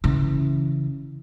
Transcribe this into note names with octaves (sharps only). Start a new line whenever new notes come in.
C#3 E3